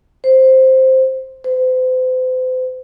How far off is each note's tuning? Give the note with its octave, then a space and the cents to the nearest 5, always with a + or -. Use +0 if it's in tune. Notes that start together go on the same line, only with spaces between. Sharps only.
C5 +5
C5 -40